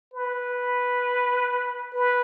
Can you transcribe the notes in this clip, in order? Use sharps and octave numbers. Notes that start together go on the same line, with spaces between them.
B4
B4